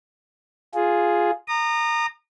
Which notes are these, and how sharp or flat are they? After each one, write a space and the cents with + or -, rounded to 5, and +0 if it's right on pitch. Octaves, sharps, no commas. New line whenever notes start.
F4 +0 G#4 +0
A#5 -10 D#6 -35